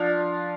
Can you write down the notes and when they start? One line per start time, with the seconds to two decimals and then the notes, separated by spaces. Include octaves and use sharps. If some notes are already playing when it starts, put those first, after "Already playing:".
Already playing: F3 D4 F4 F5